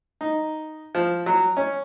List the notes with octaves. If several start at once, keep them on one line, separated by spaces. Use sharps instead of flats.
D#4
F3
F#3
C#4